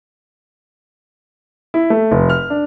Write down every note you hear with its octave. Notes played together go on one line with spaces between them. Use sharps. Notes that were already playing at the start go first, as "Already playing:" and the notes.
E4
A3
F1
F6
D4